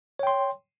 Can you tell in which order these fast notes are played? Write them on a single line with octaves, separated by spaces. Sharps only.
C#5 G5 C6